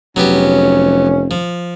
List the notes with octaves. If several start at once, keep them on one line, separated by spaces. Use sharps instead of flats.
F1 F#3 B3 C#4 G4
F3